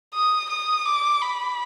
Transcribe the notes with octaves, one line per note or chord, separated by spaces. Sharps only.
D#6
D#6
D6
B5